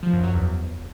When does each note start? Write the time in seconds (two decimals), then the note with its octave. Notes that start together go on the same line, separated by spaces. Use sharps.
0.03 F3
0.13 F#2
0.23 F#3
0.33 E2